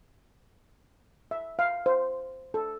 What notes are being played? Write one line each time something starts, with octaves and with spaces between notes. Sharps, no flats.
E5
F5
C5
A4